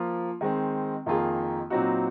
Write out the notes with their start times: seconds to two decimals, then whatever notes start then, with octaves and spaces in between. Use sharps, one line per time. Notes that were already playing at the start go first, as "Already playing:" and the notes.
Already playing: F3 A#3 F4
0.41 D#3 G#3 C4
1.06 F2 D#3 A#3 F4 G#4
1.70 A#2 F#3 C4 D#4 F#4